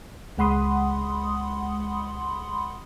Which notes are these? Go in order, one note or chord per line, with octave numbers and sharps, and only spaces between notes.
C#2 G#3 F#5 B5 C6 D#6